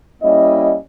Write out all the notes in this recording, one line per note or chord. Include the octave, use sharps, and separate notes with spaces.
G3 A#3 C#4 E4 D#5